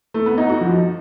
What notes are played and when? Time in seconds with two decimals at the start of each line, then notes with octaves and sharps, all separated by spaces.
0.14 A3
0.26 B3
0.38 D#4
0.49 F#4
0.61 F3